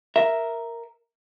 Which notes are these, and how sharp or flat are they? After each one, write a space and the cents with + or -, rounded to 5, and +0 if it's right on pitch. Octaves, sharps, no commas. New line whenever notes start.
A#4 +0 E5 +0